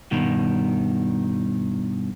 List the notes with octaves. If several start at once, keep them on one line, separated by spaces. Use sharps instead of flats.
G2 B2 D#3